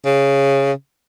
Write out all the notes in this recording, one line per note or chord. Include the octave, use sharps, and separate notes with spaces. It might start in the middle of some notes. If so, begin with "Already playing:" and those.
C#3